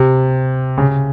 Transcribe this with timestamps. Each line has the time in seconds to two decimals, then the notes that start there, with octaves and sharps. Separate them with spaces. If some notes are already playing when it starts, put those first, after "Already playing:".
Already playing: C3
0.78 C#3